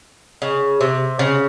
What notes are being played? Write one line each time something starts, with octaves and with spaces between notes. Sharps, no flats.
C#3
C3
C#3